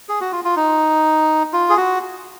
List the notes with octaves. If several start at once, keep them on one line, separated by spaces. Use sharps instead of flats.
G#4
F#4
F4
F4
D#4
F4
G#4
F#4